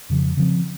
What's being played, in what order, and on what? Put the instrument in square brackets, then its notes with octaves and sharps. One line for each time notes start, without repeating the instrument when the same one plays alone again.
[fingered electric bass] F2 C#3 F3
C#3 F3 C4